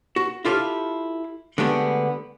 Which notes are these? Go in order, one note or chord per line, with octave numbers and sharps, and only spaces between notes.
F#4
E4 F4 G4 A4 D#5 F5
D3 G#3 A3 B3 G4